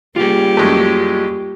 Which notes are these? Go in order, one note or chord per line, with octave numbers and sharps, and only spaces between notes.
G3 A#3 F4 G4 G#4
F#2 G#3 A3